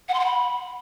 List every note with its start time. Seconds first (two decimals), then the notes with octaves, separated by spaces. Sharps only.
0.08 F#5
0.14 C6
0.20 F#5
0.25 B5